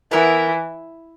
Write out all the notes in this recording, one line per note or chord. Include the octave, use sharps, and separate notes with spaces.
E3 B3 E4 A#4 E5